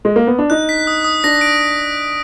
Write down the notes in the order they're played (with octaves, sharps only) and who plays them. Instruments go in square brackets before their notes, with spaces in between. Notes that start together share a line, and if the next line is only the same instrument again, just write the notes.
[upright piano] G#3
A#3
B3
D4
[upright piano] D#4 [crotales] F#6
[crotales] B6
D#6
D#6
[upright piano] D4 [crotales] A#6
[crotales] D7